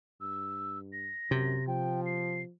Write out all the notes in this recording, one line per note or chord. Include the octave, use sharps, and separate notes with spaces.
G2 E6
A#6
F#2 C3
F3 G5
C7